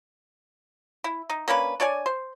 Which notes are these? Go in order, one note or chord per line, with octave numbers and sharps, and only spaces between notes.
E4
D#4
A#3 C#4 D4 B4
D4 C#5 D5 G#5
C5